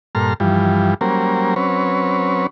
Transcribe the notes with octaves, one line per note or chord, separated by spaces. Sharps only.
G2 A#2 A4 A#5 C6 F6
G2 E3 F3 G3
F#3 G3 A#3 C#4 A#4 C5
F#3 C4 C#4 B4 C#5